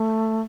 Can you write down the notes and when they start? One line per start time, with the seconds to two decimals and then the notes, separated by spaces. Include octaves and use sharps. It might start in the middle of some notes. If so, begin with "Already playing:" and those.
Already playing: A3